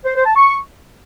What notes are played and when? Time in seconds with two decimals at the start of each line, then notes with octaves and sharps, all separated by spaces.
0.05 C5
0.15 C5
0.26 A5
0.36 C#6